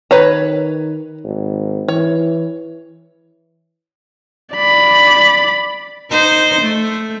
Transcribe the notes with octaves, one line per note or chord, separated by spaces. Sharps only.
D#3 B4 C#5 A#5
G#1
E3 C#5
D5 B5
D#4 C5
A3